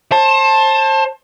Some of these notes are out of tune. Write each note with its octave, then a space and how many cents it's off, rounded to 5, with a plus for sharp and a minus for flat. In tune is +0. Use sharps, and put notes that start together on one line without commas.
C5 +35 A5 +0